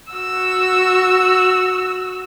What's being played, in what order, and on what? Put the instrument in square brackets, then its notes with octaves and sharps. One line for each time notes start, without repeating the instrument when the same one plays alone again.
[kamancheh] F#4 E6